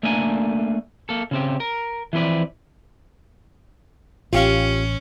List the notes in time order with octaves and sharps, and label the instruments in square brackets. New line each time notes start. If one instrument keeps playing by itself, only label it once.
[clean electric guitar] A3 A#3 D4 A4 G#5
A#3 A4
C#3 C4 G4
A#4
E3 F3 C4 B4 D5
[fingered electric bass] A1 [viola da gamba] C#4 [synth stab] F4 G4 F5